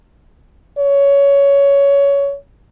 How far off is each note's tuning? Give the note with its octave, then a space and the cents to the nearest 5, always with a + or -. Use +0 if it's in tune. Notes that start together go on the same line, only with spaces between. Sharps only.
C#5 +15